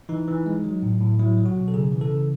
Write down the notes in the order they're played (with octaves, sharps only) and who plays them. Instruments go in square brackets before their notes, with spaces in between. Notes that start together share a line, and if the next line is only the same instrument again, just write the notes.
[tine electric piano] E3 D#4
E3
G#3
F#3
A2
A2
F#3 E4
F#3
F#4
B2
A4
C#3 G#4
E3
A4
C#3